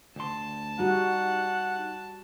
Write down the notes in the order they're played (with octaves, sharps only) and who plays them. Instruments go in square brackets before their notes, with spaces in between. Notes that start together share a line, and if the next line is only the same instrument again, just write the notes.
[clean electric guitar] D2 C6 [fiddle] A5
[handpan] G3 F#4 [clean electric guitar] D#4 [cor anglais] F#5